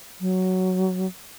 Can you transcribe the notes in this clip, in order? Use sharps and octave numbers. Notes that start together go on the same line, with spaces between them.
F#3